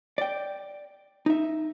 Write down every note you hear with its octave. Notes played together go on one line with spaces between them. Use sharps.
D5 G5
D#4 E5